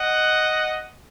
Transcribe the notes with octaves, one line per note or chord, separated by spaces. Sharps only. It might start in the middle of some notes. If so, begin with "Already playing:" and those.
Already playing: D#5 F#5